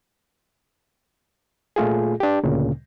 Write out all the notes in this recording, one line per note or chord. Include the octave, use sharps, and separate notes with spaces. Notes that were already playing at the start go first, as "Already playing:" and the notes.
A#2 A3 F4 G#4
D4 G4
D2 A#2 C#3